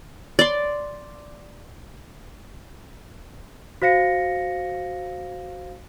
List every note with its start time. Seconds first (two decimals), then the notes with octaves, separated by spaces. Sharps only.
0.39 D5 C6
3.82 F#4 C5 F5 A#6 C#7